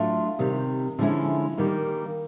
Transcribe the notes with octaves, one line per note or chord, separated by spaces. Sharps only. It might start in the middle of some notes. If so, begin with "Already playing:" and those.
Already playing: A2 F#3 A3 D4 F4
C3 D#3 G3
D3 F3 G#3 C#4 E4
D#3 G3 A#3 D#4